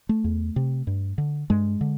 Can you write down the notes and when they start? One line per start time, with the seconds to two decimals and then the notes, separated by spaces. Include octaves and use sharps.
0.09 A3
0.24 E2
0.56 C3
0.87 G2
1.18 D3
1.50 G2 G#3
1.81 D3